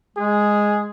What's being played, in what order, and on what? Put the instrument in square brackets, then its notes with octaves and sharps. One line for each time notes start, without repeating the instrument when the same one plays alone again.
[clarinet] G#3 [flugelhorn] G#4